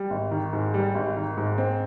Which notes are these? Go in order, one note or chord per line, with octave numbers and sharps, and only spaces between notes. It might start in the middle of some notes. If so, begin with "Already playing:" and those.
Already playing: G3
G#1
D#3
G#2
G3
G#1
D#3
G#2
C4